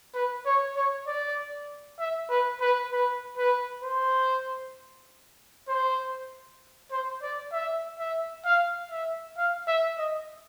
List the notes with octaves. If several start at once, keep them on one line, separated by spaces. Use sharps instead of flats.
B4
C#5
C#5
D5
E5
B4
B4
B4
B4
C5
C5
C5
D5
E5
E5
F5
E5
F5
E5
D#5